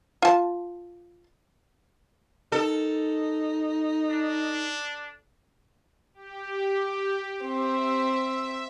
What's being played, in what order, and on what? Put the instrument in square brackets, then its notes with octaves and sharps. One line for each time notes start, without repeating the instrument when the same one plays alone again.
[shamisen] F4 A5
[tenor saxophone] D#4 [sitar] A4
[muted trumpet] D4
[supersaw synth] G4
[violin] C4 [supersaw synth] E5